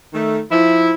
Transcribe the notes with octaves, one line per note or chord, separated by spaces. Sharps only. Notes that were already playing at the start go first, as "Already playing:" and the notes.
D#3 A3
F3 E4